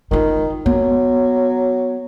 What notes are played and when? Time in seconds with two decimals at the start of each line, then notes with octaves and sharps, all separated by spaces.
0.11 D#3 D#4 F4
0.66 F#3 B3